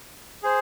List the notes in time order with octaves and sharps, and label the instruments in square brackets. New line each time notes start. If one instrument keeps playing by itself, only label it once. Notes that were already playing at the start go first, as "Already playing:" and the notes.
[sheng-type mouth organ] G#4 C5